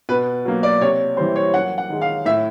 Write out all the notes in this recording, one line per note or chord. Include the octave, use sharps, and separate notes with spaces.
B2 B4
F#3 A#3
D5
C3 C#5
E3 G3 C5
C#5
F#2 F#5
F#5
D#3 G#3
F5
A2 E5